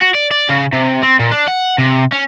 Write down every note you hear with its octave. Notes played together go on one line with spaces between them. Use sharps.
F#4
D5
D5
C#3
C3
C4
A#2
D4
F#5
C3
C#4